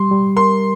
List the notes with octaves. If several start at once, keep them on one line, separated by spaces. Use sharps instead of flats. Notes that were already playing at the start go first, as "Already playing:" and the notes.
Already playing: G3 C6
G3
A#4 C6